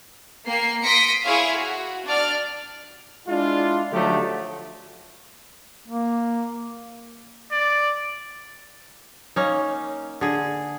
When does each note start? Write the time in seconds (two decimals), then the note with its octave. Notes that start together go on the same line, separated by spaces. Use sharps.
0.47 A#3 G5 C7
0.84 C6 D#6 A#6 B6 C#7 D7
1.24 E4 G#4 C#5 E5 F5 C6
1.56 F#4
2.06 D4 D5 F6
3.27 G#3 D4 E4 F4
3.92 D3 F3 F#3 A3 D#4 G4
5.88 A#3
7.51 D5
9.36 A#3 C#4 D#4
10.21 D3 G#4